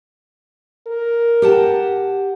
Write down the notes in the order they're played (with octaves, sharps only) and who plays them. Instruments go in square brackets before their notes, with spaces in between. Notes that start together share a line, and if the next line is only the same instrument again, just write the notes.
[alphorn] A#4
[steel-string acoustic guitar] G4 F#5 A5